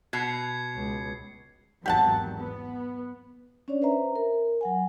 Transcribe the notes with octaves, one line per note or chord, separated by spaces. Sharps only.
B2 G#6 C7 C#7
C#2
G#1 E2 F#3 G4 F#5 A5
B3
C#4 D4 C#5 D5
B4 C5 E5 A#5
A#4
F#3 F#5 G#5